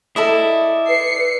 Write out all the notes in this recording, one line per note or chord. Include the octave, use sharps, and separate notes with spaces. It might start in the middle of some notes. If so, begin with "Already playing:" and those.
E4 A4 D5 D#5
B4 C7 C#7